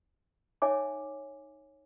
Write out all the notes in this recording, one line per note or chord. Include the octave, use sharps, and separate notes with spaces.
D#4 C#5 E5 G#5 D6